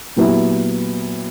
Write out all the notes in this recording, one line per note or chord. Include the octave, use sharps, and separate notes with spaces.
A#2 F#3 B3 E4 G4